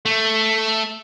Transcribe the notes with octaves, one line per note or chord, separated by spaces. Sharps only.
A3